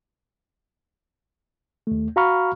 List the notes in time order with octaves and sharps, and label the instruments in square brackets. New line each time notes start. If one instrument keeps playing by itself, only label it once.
[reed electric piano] D#2 A3
F#4 F5 A#5 B5 C#6 F6